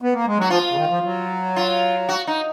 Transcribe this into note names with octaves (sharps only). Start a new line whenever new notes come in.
B3
A#3
G#3
F#3 F#4
F3 F4
C#3
D#3
F3
F#3
F4
F#4
D#4